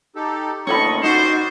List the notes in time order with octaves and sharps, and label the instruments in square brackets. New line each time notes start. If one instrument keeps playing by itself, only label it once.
[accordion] D#4 G4 A4
[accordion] D2 A#2 D#3 [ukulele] C#4 A4 B5 [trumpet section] D#5 C#6
[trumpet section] G3 C5 [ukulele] D#4 [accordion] F#4